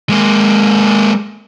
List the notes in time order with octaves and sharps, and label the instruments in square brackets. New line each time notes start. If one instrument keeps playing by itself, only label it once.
[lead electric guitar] G#3 A#3